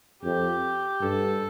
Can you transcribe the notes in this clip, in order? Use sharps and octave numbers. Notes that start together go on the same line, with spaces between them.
F2 G4
G2 A4